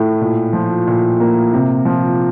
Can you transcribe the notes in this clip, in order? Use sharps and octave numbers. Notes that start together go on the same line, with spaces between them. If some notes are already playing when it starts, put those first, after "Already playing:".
Already playing: A2 A3
A#2
F3
A#2
A#3
C3
F3